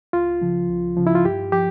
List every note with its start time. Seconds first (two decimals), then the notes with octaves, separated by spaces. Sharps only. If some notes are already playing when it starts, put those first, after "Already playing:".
0.13 C#2 F4
0.41 C#3 F3
0.69 C#2
0.97 C#3 F3
1.07 E4
1.15 F4
1.25 G2 G4
1.52 F3 G4